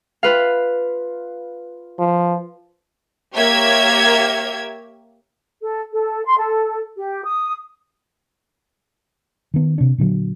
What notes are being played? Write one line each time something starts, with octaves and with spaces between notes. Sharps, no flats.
F4 B4 F5
F3
A#3 G4 C#5 E5 G#6
A4
A4
C6
A4
G4
D#6
D#3 B3
C3 D4
A#2 D3 F#3